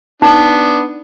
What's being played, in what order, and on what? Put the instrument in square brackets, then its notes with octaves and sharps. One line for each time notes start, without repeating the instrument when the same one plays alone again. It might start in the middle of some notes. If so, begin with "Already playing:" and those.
[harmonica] B3 D4 [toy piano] D#4